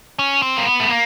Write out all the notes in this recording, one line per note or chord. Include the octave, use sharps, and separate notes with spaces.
C#4
C4
A#3
B3
A3
A#3